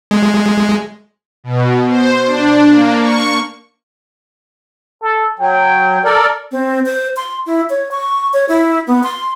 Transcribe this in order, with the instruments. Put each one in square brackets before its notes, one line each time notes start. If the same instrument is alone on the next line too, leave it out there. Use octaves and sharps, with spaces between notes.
[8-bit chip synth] G#3
[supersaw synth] B2
C5
D4
A#3
C#6
[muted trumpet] A4
[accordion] F#3 [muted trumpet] G5
[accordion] A4 A#4 D5
[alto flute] C4
C5
C6
E4
C#5
C#6
C#5
E4
B3
C6